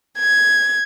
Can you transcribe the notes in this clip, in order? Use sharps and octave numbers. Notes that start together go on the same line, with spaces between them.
G#6